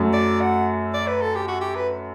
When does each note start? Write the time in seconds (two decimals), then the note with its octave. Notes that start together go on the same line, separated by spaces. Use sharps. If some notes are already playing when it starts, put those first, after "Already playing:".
Already playing: F#2 F#3 A3
0.13 D5
0.41 F#5
0.94 D5
1.07 B4
1.22 A4
1.35 G4
1.48 F#4
1.61 G4
1.75 B4